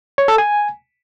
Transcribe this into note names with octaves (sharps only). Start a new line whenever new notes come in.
C#5
A4
G#5